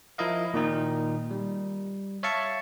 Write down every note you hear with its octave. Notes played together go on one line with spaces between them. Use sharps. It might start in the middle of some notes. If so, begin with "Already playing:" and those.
F3 E4 A#4 D#5 F5
A#2 D#3 D#4
G3
C#5 E5 F5 A5 C#6